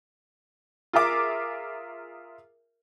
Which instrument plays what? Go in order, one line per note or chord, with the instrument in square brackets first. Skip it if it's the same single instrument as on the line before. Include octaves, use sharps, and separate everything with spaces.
[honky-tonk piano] F4 G#4 A#4 E5 D6